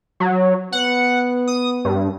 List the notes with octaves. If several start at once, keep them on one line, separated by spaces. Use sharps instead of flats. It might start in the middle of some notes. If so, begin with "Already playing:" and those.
F#3
B3 F#5
D#6
G2